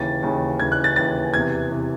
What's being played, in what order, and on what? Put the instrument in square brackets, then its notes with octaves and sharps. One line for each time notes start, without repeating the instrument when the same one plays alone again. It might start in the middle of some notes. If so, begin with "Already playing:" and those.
Already playing: [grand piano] D#2 C#3 E3 A6
D#2 C#3 E3
D#2 C#3 E3 G#6
F#6
A6
D#2 C#3 E3 A6
E2 C3 E3 G#6
C3 E3